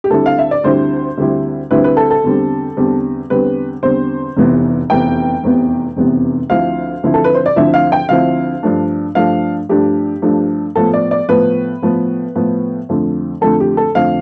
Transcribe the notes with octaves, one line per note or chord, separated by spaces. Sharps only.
G4
D2 D3 G3 C4 E4 A4
F5
E5
D5
D2 D3 G3 C4 E4 C5
D2 D3 G3 C4 E4
D2 D3 G3 C4 E4 B4
B4
A4
A4
E2 D3 G3 C4
E2 D3 G3 C4
E2 D3 G3 C4 B4
E2 D3 G3 C4 C5
F1 E2 C3 E3 B3
F1 E2 C3 E3 B3 G5
F1 E2 C3 E3 B3
F1 E2 C3 E3 B3
D2 D3 F3 C4 E4 F5
D2 D3 F3 C4 E4
A4
B4
C5
D5
D2 D3 F3 C4 E4 E5
F5
G5
D2 D3 F3 C4 E4 F5
G2 F3 A3 D4
G2 F3 A3 D4 F5
G2 F3 A3 D4 G4
G2 F3 A3 D4
A2 F3 B3 A4
D5
D5
A2 F3 B3 B4
A2 F3 B3
A2 F3 B3
F2 D3 F3 A3
F2 D3 F3 A3 A4
G4
A4
F2 D3 F3 A3 F5